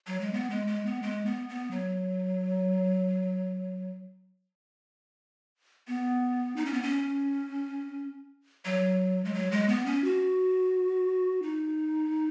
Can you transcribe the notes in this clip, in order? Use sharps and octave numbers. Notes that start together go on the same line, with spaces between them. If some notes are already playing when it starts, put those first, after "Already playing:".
F#3
G#3
B3
G#3
G#3
B3
G#3
B3
B3
F#3
B3
D#4
C#4
B3
C#4
F#3
G#3
F#3
G#3
B3
C#4
F#4
D#4